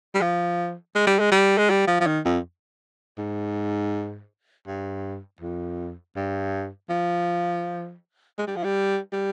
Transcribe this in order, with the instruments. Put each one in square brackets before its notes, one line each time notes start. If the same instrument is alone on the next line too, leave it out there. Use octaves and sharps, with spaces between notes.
[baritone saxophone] G3
F3
G#3
G3
G#3
G3
G#3
G3
F3
F3
D#3
F2
G#2
G2
F2
G2
F3
G#3
G3
F3
G3
G3